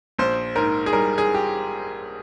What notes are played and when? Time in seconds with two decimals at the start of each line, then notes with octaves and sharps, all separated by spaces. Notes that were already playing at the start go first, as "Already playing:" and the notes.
0.19 A#1 C5
0.55 G#2 A#4
0.86 G#4
0.93 G3 A#4
1.18 G#4
1.34 G4